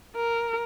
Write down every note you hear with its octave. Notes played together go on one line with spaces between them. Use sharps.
A#4